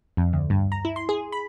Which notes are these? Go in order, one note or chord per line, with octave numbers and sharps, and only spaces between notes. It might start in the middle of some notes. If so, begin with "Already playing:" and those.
F2
D2
G2
A#5
E4
C6
G#4
B5